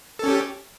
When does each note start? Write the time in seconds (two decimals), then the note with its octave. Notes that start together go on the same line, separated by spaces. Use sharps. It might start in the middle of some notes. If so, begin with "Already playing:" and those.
0.19 A4
0.24 C#4
0.28 G4